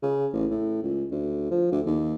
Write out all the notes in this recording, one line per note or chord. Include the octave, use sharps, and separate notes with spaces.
C#3
A1
A2
C#2
D2
F3
D2
D#2